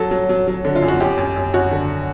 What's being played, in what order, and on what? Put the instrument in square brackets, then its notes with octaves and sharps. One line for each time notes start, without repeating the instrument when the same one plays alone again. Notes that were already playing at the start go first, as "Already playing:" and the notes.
Already playing: [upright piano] F#3 A4
F#3
F#3
F#3
D3
F4
F#2
F#4
F#2 G4
F#2
F#2
F#2 F#4
D3